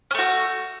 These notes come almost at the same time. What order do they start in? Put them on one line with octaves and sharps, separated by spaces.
C#4 A3 F#4